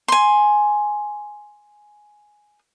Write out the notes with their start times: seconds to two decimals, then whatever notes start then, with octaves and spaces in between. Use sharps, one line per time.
0.08 G#5 C6